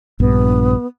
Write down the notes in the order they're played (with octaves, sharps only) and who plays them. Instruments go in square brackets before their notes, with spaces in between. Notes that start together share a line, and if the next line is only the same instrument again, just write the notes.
[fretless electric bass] A#1 G2 [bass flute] B3